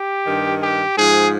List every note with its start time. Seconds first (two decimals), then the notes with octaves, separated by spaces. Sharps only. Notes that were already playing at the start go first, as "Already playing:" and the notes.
Already playing: G4
0.27 G2 D#3
0.62 G4
0.97 G#2 F3 G#4